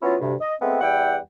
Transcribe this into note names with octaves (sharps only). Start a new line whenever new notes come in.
F#3 B3 C#4 E4 F4
D2 G2 C3
D#5
G#3 A3 B3 C4
E2 G3 E4 F#5 G5